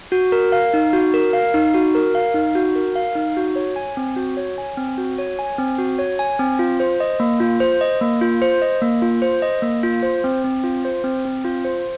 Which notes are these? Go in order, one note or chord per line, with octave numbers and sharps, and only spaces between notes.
F#4
A#4
F5
D#4
F#4
A#4
F5
D#4
F#4
A#4
F5
D#4
F#4
A#4
F5
D#4
F#4
C#5
G#5
C4
F#4
C#5
G#5
C4
F#4
C#5
G#5
C4
F#4
C#5
G#5
C4
F4
C5
D#5
A#3
F4
C5
D#5
A#3
F4
C5
D#5
A#3
F4
C5
D#5
A#3
F4
C5
C4
C4
F4
C5
C4
C4
F4
C5